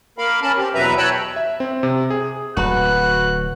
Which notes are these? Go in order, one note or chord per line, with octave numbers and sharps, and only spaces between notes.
A#3 A#4 F5 B5
C#4 A#4 A5 B5
C4 G4
E2 B2 F#3 B4 E5 A#5
C#5 G5 A5 B5 E6 F#6
E5
C4
C3
G#4
D1 F#3 F#4 B4 F#6